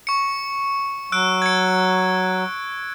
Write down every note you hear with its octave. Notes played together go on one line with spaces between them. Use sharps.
C#6 C#7
F#3 E6 F#6 D7
G#6 C#7